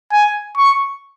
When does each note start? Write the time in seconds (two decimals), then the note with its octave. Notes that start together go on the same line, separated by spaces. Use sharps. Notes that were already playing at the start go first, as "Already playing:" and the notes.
0.12 G#5
0.57 C#6